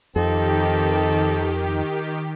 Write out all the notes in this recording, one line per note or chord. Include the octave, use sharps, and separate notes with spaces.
F2 D#3 C4 D#4 G4 A4